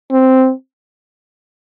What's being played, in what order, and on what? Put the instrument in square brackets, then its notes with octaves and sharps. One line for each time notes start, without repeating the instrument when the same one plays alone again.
[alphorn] C4